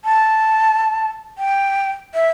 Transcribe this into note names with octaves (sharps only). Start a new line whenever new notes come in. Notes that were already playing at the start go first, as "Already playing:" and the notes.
A5
G5
E5